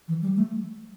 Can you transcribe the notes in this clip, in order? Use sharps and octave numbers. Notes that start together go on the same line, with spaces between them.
E3
G3
A3